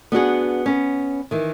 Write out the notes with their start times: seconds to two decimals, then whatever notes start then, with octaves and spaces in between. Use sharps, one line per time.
0.12 B3 D4 F#4 G#4
0.66 B3 C#4
1.31 D#3 E3